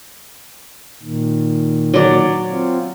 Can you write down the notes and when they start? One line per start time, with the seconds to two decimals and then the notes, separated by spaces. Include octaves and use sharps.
1.03 A#2 D#3
1.94 F#3 D5
2.50 C4 F4